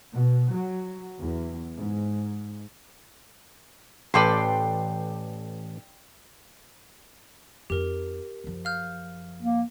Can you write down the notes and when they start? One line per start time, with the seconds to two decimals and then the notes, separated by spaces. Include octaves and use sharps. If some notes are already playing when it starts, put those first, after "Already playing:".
0.12 B2
0.52 F#3
1.19 E2
1.77 G#2
4.14 A1 A4 B4 D5 G5 C6
7.70 F2 D#4 G4 A#4
8.44 F#2 F3
8.65 F5 F6 G6
9.42 A#3